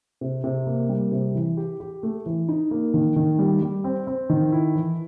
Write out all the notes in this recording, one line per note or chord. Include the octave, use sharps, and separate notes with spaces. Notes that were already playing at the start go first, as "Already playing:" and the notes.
C3
C3
A#3
G3
C3
E3
G4
G4
A3
E3
D#4
A#3
D#3
D#3
G3
G3
C4
C4
D#3
E4
E3